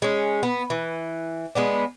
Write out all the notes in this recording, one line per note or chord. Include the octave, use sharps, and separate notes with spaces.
G#3 C#4
B3
E3
G#3 B3 D4